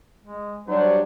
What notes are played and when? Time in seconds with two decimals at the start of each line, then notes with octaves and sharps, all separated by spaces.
0.24 G#3
0.68 F#3 G3 D4 C5